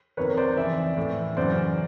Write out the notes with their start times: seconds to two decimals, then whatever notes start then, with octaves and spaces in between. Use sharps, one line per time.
0.17 F2 C3 D#3 B4 C#5
0.37 C5 D5
0.57 F2 C#3 E3 D5 E5
0.97 A2 E3
1.37 F#2 C#3 E3 C5 D5